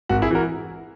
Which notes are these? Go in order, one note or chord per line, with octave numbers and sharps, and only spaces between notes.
G#1 F#4
E4 G#4
E3 F#4 A#4